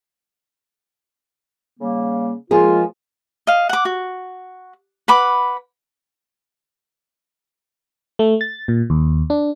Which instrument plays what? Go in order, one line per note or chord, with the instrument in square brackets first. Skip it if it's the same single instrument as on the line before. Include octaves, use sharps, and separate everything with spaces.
[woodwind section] C#3 G3 A#3
[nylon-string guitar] F3 A#3 G#4 [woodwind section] G#3 F4
[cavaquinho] D#5 F5
F#5 D6
F#4
B4 F#5 B5 D6
[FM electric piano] A3
A6
A#2
D#2
D4